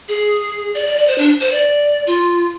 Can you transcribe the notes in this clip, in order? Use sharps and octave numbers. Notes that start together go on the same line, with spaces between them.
G#4
D5
D5
D5
C5
D4
C5
D5
F4